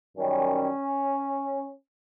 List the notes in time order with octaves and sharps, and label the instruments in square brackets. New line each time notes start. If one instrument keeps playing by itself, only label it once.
[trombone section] F#2 D#3 G3 C#4